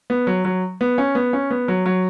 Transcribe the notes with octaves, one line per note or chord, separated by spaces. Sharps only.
B3
F#3
F#3
B3
C#4
B3
C#4
B3
F#3
F#3